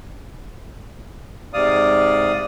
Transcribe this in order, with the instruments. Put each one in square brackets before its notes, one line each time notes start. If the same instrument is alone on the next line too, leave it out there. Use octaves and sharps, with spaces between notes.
[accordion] G#2 C3 D5 F5 D#6